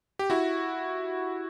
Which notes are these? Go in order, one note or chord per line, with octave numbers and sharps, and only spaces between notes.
G4
E4 F#4